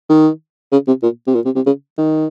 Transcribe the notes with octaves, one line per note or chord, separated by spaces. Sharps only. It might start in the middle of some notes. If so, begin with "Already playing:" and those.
D#3
C#3
C3
A#2
C3
A#2
C3
C3
C#3
D#3